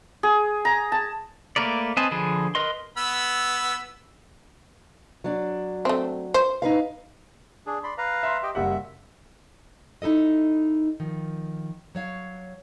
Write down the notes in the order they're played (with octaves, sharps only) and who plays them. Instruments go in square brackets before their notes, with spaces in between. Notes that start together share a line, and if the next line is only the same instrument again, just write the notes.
[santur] G#4
A#5
A5
[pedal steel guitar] A3 A#3 A#4 B4 D5
C4 B4 D#5 G#5 A5
D3 F3 G#4 B4
A#4 B4 D#5 C6
[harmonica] B3 B5 E6
[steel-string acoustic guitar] F#3 D4
[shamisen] A3 C4
C5
[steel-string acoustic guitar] D#4 B4 F5
[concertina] D4 G#4
D5 B5 C6
B4 F5 A#5
[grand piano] E5 C6
[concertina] G4 D#5 G5
[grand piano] F#1 G3 F#5 [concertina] E5
[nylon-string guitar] D#4 E4 A4 D#5
D#3 F3
F#3 C#5 F5